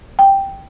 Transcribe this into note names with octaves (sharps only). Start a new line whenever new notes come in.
G5